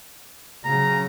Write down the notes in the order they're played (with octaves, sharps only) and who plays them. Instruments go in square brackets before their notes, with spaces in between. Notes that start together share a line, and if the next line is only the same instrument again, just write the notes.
[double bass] C#3 F#3 [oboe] A#5